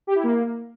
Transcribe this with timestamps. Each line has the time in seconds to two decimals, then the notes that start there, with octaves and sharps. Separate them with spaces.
0.07 G4
0.15 E4
0.23 A#3